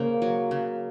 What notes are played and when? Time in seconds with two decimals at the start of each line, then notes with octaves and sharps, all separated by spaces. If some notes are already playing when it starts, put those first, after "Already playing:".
Already playing: C#3 A#3 C5
0.22 F#3
0.51 C#3